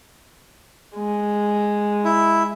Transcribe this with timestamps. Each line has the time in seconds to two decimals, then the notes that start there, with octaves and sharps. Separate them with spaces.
0.95 G#3
2.05 E4